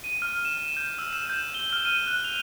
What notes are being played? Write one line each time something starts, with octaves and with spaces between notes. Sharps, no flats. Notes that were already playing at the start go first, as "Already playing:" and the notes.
D#7
F6
E7
G6
E6
E7
G6
G7
F6
D#7
F#6
F7